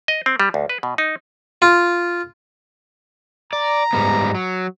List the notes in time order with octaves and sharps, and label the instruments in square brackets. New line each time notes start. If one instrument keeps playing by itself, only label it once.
[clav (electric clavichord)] D#5
C4
G3
D2
B4
B2
D#4
[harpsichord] F4
[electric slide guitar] D5 [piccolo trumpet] A#5
[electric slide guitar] G#2 G3 B3
F#3